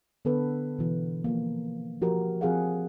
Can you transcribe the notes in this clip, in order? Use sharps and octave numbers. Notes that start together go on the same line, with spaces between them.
D3 B3 A4 B4
B2 E3
F3 A#3
F3 F#4 G4 A#4
F3 C4 G#4 F5 F#5